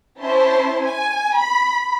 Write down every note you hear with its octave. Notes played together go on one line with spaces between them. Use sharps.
C#4 E4 C5 A5 C6
G#5
B5